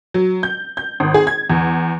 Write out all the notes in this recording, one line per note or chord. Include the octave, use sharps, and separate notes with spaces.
F#3
G6
G6
G#1
G#4
G#6
E2